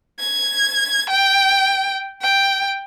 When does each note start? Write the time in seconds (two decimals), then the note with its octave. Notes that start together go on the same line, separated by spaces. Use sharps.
0.20 G#6
1.10 G5
2.22 G5